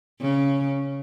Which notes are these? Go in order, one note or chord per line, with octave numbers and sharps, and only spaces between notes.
C#3